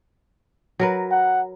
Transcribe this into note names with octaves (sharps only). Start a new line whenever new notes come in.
F#3 A#4 B4
F#5